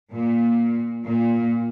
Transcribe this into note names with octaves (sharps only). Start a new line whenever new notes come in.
A#2
A#2